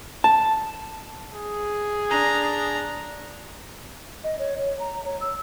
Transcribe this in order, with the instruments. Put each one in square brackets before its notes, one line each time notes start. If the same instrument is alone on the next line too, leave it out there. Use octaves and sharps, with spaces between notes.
[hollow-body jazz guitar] A5
[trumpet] G#4
[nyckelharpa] D4 A#5
[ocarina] D#5
C#5
C#5
A#5
C#5
E6